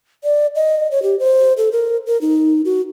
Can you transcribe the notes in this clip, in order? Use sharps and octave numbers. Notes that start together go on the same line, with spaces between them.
D5
D#5
C#5
G4
C5
A4
A#4
A#4
D#4
F#4